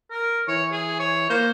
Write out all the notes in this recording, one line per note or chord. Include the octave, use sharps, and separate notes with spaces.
A#4
E3 C#5
G#4
C#5
A#3 C5